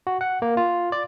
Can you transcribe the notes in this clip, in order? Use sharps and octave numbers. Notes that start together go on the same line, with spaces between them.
F#4
F#5
A#3
F4
D5